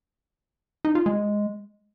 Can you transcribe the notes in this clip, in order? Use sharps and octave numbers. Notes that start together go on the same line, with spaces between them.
D#4
F4
G#3